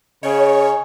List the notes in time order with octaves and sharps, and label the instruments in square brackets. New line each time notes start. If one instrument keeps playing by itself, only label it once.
[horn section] C#3 [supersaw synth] C#5 [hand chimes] D#5 G#5